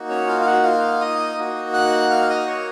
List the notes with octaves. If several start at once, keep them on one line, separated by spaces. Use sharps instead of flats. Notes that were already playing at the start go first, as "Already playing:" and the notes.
Already playing: A#3 D#4 F#4
C#4 C#5
F4 F5
F5
F#4 F#5
F4 F5
D#5 D#6
A#3 D#4 F#4
F#5 F#6
F5 F6
D#5 D#6
C#5 C#6